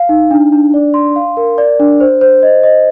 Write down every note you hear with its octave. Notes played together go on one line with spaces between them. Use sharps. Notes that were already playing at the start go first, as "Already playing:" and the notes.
Already playing: F5
D#4
D4
D4
D5
C6
F5
A#4
D5
D4
C5
C5
D#5
D#5